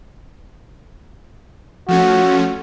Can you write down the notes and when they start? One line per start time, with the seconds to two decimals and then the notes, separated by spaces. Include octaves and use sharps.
1.88 F3 A3 C#4 F#4